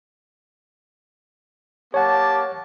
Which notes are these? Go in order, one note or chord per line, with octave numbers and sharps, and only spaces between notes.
A#3 G4 C#5 F#5 A5